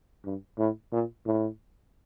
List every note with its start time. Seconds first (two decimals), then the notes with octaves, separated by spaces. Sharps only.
0.25 G2
0.58 A2
0.93 A#2
1.26 A2